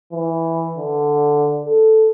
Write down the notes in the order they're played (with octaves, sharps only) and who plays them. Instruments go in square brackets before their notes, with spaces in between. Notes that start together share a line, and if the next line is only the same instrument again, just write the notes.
[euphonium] E3
D3
A4